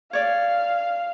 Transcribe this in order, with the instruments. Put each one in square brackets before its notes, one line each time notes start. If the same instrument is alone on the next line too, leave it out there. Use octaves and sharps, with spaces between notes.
[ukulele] C#5 D5 [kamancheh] F5